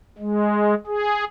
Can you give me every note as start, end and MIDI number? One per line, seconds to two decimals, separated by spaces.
0.18 0.74 56
0.87 1.25 68